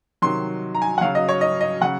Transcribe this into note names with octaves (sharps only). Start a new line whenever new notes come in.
C3 D#3 F#3 C6
A#5
G#5
F#5
C#3 F#3 F5
D#5
C#5
D#5
D#5
C#3 F#3 F#5